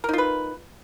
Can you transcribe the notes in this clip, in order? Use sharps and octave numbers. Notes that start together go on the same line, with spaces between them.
D#4 F4 A#4 B4